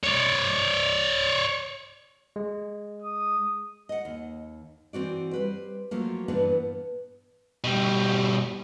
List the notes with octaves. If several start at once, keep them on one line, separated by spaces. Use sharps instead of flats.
C#5 D5
G#3
D#6
D#5 F#5
D#2
E3 C4 F#4 D5
G3 B4 C5
F3 F#3 A3 A#3
G2 A#2 E3 B3 D4
B2 G3